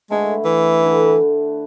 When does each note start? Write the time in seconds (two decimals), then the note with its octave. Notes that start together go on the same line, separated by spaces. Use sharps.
0.10 D3 G#3 A3 E4 B4
0.45 E3
0.80 D3 A3 E4 B4